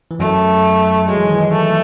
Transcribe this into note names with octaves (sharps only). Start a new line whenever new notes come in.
E3
F#2 F#3 A3
F#3 G#3
E3
D#3
E3
A3